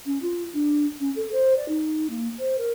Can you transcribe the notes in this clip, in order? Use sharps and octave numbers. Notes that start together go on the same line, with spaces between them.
C#4
F4
D4
C#4
A4
C5
D5
D#4
A#3
C5
A#4